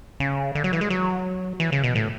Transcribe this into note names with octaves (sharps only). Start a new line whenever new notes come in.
C#3
D3
F#3
E3
G#3
F#3
E3
C#3
B2
A2